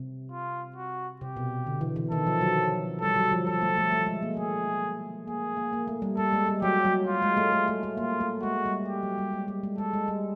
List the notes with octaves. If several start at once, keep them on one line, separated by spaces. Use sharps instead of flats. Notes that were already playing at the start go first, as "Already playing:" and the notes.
Already playing: C3
F4
F#4
C3 G4
B2
D3
E3
E3
D#3 A4
F3
F#3
G3 A4
F#3
F3
F3 A4
A3
A3
A3
G#3
A#3
A3 G#4
A#3 G#4
A#3
A#3
A3
G3
G3 A4
G#3
G3
F#3 G4
F#3
F4
G#3
A3
A3
A3
A3
A#3 F4
A3
G#3 F#4
G3
G4
F#3
G3
G#3
G3
G#3
G#3 A4
G#3
G3